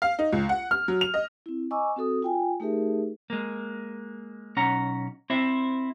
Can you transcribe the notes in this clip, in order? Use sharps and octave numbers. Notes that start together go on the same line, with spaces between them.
F5
D#4
C#2
F#5
F6
F#3
F7
D#5
C4 E4
D#5 G#5 A#5 C#6 D6 E6
C4 F#4 A4 D#6
F4 G5 G#5
A3 D#4 G4 G#4 A#4 E5
G#3 A#3
B1 C#4 F#5 A#5
C4 E4 C5 E5